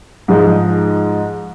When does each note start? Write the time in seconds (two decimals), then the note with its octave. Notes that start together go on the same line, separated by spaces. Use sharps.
0.28 G#2 F3 G#3 D#4